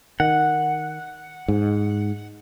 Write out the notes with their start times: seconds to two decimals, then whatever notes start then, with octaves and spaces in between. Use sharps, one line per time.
0.20 D#3 F#5
1.48 G#2